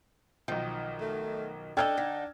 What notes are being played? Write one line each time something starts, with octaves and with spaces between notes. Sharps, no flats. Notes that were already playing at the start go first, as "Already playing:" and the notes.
B1 D#3 F3
A3
D4 A4 A#4 D#5 G5 E6 F6 G#6
D3 D#4